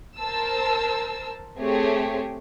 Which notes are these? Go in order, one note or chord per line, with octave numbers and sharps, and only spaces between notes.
A#4 C5 A5 E6
A3 C4 G4 G#4 C#5